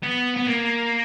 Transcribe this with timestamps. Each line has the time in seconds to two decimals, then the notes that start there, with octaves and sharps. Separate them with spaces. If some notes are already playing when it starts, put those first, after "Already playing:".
0.03 B3
0.37 B3
0.47 A#3